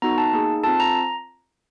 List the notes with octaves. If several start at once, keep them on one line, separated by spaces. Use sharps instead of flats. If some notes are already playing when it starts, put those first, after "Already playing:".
B3 D#4 F#4 A4 A#5
A5
A#3 D#4 G#4
C4 F4 A4 A5
A#5